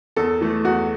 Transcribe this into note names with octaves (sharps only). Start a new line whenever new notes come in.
E2 A4
E3 A3
E2 F#4